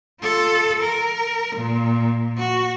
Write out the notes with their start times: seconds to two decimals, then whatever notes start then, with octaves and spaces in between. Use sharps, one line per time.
0.22 F4 A4
0.83 A#4
1.56 A#2
2.38 F#4